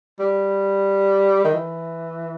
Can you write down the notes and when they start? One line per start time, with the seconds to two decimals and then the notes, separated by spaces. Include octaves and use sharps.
0.19 G3
1.44 D#3
1.53 E3